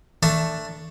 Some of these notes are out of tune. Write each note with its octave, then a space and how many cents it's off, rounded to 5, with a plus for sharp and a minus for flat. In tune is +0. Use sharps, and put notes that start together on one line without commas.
A3 +10 D4 +0